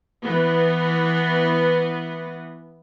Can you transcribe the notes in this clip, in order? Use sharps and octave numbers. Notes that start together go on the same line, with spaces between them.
E3 B3